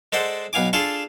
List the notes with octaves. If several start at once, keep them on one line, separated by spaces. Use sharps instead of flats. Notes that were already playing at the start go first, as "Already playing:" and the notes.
G#3 A4 C5 D5 F#5
B1 B3 F5 G#5 D6
D4 F4 G#4 A4 A5 C6